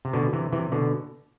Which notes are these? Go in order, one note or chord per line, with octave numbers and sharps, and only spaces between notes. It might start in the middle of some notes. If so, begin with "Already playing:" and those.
C3
B2 D3
C3 E3
C3 E3
B2 D3